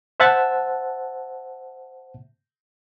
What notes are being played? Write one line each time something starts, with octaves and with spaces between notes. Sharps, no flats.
C5 E5 F#5 A5